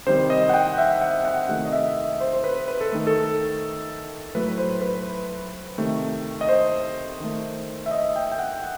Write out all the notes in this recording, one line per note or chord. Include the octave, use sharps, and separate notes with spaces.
C3 D#3 G3 C5
D#5
F#5
G5
E5
F#5
F#5
C3 D#3 A3
D#5
E5
D#5
C5
C5
B4
B4
A4
D#3 A3
A4
A2 F#3 A3 B4
C5
B4
C3 D#3 A3
D#5
C5
D#3 A3
E5
D#5
G5
G5
F#5